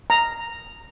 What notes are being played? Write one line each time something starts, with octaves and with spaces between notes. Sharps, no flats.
A#5